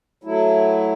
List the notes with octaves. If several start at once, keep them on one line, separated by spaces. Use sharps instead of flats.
F#3 A3 E4